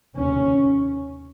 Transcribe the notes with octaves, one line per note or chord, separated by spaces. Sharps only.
F1 D#2 C#3 C#4